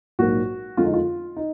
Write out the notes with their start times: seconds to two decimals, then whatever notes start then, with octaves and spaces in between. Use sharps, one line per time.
0.19 A#1 G#2 F#3 A#3 F#4
0.77 F2 D3 G#3 F4
0.85 D#4
0.94 F4
1.37 D#4